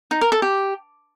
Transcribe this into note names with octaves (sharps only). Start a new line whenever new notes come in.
D#4
A#4
A4
G4